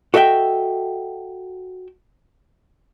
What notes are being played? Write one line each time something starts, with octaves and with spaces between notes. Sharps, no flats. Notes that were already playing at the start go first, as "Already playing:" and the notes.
F#4 A4 D#5 E5 G5